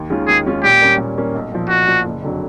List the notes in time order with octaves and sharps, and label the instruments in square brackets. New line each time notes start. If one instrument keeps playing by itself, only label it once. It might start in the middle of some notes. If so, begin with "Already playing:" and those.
Already playing: [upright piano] D#2
D#3 G#3 C#4 F4
[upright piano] D#2 [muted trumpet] G#4
[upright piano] D#3 G#3 C#4 F4
[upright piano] A#2 [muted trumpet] G4
[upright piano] G3 A#3 C#4
A#2
G3 A#3 C#4
B1
A#2 F3
[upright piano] B1 [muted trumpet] F#4
[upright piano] A#2 F3
F#1
F2 D3 F#3